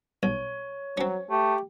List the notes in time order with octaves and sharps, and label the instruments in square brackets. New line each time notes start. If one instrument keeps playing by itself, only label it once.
[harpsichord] B1 [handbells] C#5
[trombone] F#3 [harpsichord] C4 C#4
[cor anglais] A3 [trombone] G4